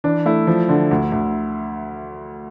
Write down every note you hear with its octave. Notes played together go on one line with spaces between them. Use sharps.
E3 D4
A3 E4
F3
D3
D2
D2